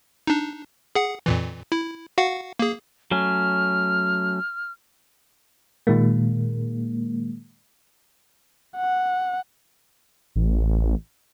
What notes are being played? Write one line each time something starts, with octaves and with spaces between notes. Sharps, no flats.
D4 D#4
G#4 F#5
F2 A#2 E3
E4
F#4 F5 F#5
A#3 G#4
F#3 A3 C#4 F6
A#2 D#3 G#3 A#3
F#5
A1